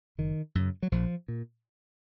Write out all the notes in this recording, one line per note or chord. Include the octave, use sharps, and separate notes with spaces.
F#1 D#3
F#2 C#3
F#3
A#1 F3
A#2